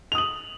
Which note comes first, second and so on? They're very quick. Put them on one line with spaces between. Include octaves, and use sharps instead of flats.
F7 D#6 F#7